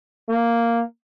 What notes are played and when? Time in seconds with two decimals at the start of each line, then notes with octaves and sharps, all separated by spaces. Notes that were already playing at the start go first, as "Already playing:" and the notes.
0.29 A#3